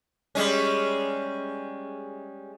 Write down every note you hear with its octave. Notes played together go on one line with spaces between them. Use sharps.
G3 G#3 C#4